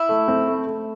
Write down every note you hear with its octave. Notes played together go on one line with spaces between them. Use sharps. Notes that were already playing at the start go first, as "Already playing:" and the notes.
Already playing: E4
A3
C4
A3
A3